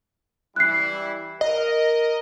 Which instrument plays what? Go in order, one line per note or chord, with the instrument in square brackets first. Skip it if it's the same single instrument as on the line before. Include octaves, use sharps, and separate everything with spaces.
[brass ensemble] E3 G3 E4 [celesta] F#6 C7
[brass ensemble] A#4 [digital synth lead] D#5